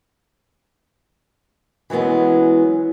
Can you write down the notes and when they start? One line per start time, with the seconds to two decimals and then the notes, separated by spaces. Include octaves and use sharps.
1.90 E3 F#3 G#3 B3 C#4